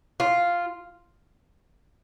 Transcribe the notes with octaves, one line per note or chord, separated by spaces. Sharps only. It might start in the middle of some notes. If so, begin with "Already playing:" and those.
F4